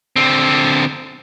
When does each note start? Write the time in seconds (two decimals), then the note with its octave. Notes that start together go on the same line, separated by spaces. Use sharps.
0.16 D3 C4